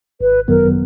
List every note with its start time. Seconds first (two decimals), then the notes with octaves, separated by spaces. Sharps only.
0.21 G#1 B4
0.48 F#2 D#3 F#3 B3 A#4